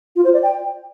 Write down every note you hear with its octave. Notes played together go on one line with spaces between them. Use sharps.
F4
C5
D5
G5